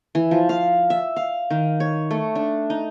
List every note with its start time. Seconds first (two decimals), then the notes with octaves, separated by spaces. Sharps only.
0.15 E3
0.31 F3
0.49 F5
0.90 E5
1.16 F5
1.50 D#3
1.80 C#5
2.11 A3
2.35 D4
2.70 D#4